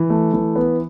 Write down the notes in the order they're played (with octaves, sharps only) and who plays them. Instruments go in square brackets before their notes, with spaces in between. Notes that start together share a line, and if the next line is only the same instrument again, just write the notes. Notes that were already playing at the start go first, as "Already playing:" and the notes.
Already playing: [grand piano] E3
A3
E3
B3